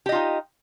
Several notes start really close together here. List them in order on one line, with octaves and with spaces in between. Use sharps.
G4 D#5 F4 D#4